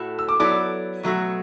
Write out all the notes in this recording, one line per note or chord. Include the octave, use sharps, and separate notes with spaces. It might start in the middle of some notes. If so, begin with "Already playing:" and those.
Already playing: A2 A3 F#4 A4
E6
D6
F#3 B3 E4 A4 D5 D6
B2 F#3 A3 F#4